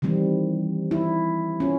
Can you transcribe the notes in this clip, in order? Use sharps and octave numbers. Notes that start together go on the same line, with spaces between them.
D#3 E3 G3 C4
E4
C#4 F4